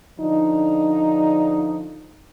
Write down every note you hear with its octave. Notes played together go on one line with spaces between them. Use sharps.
D3 F3 D4 D#4